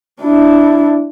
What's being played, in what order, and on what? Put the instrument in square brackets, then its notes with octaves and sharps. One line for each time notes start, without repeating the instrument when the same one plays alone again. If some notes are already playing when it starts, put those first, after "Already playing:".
[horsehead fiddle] D4 E4